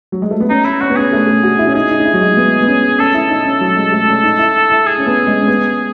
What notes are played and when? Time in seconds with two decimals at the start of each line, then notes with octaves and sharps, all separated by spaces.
0.12 F#3
0.22 G#3
0.31 A3
0.40 B3
0.50 C#4 D#4
0.65 E4
0.81 C#4 F#4
0.90 B3
0.96 C#4 G#4
1.13 A3
1.27 A3
1.43 F#4
1.59 E4
1.67 C#4
1.75 D#4 G#4
1.90 D#4
2.00 D#4
2.06 E4
2.14 F#3
2.21 G#3
2.37 B3
2.62 B3
2.68 C#4
2.99 C#4 A4
3.14 E4
3.30 D#4
3.46 C#4
3.61 F#3
3.76 G#3
3.92 A3
4.08 C#4
4.23 D#4
4.39 E4
4.70 E4
4.86 G#4
4.98 C#4
5.07 B3
5.27 G#3
5.40 C#4
5.48 B3